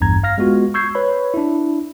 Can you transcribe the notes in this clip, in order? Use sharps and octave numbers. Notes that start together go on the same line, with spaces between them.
A1 E2 G2 A#5 G#6
F5 F6 A#6
G#3 B3 F4 F#4
C#6 E6 G6 G#6 C7
B4 C#5 B5
D4 E4